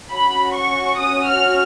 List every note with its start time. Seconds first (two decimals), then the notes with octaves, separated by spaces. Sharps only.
0.11 C#4 F#4 B5
0.55 C#6
0.99 D#6
1.28 F6